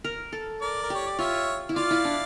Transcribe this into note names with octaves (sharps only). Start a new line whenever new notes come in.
A#4
A4
A#4 D5
A#4
G4 C#5
D5
F4 C#5 E5
E4
F4 D5 F5
E4
D4